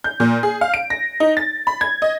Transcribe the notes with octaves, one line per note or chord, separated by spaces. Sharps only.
G6
A#2
G#4
F5
D7
A#6
D#4
A6
B5
G#6
D#5